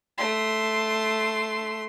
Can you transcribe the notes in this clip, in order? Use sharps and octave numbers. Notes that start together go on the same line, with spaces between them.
A3 C6